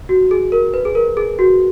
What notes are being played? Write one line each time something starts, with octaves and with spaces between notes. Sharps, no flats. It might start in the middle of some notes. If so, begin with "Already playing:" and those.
F#4
G#4
A#4
B4
G#4
A#4
G#4
F#4